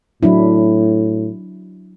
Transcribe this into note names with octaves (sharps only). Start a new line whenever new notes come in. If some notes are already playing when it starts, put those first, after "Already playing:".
A2 F#3 D4 E4